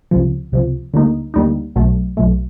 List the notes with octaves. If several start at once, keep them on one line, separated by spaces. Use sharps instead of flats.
C#2 C3 F3
C#2 C3 F3
D2 D3 G3 A#3 D#4
D2 D3 G3 A#3 D#4
B1 B2 F#3 A3
B1 B2 F#3 A3